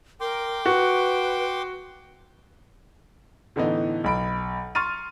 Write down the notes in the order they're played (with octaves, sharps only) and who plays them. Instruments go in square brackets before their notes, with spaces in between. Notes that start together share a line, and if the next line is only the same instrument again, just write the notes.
[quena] A#4 [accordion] G5 C6 D6
[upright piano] F#4 [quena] B4
[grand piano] A2 D3 E3 B3 D#4
B1 B5 D7
C6 C#6 F6 A6 D#7